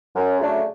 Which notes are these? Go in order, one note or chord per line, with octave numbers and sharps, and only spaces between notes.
F#2
C#3 F#3 A3 D4